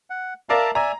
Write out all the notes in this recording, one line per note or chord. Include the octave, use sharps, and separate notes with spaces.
F#5
A#4 D5 E5 F5 A5 A#5
D5 E5 G#5 A#5